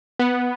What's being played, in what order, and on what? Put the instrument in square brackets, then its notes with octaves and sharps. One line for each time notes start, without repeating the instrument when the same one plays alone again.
[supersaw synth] B3